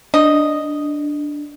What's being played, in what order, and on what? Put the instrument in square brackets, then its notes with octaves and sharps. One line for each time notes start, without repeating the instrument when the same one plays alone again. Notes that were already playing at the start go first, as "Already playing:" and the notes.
[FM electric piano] D4 [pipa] D#5